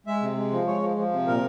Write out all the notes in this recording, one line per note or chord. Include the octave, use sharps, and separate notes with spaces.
G#3 E5
C3
G#3
F3
G#3 C#5
F3
F3
C3
A#2 A#4